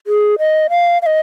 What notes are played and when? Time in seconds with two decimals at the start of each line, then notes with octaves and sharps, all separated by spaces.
0.07 G#4
0.39 D#5
0.70 F5
1.02 F5
1.06 D#5